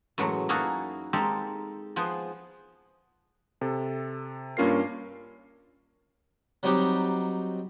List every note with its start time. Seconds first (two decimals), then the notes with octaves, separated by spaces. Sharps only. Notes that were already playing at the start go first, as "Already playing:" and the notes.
0.18 F#2 A2 E3 F#3 G#3 A3
0.49 A#3 D#4 E4 F#4 G#4 A4
1.13 G#3 A#3 C4 D#4 G4 A4
1.96 F3 B3 G#4 C5
3.61 C3 A4
4.57 G2 A#3 C#4 F4 A#4 C7
6.63 F#3 G3 C4 D#4 F#4 G4